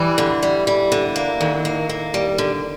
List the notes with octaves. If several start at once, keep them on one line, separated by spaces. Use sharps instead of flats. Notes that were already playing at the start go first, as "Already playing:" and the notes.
Already playing: E3 G3
D3
G3
G3
D3
A#3
D3 D#3
A#3
A#3
G3
D3